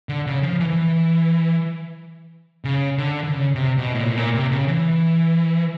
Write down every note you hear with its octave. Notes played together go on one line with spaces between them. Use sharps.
D3
C#3
F3
E3
C#3
D3
D3
C#3
C3
B2
A2
A#2
A2
A#2
C3
C#3
E3